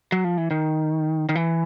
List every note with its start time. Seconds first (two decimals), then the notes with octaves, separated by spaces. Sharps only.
0.12 F#3
0.24 F3
0.38 E3
0.51 D#3
1.29 D#3
1.35 E3